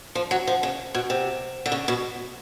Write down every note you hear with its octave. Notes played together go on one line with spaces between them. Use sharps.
F3
F#3
F3
C#3
B2
C3
D3
C#3
B2